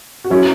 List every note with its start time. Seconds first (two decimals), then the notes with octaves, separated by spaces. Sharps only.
0.24 F#4
0.30 F#3 C#4 E4